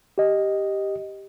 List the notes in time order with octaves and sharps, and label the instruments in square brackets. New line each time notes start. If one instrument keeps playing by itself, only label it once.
[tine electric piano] G4 D#5